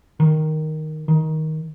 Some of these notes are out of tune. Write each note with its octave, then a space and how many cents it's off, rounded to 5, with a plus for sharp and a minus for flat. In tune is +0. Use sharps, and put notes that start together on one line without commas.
D#3 +0
D#3 +15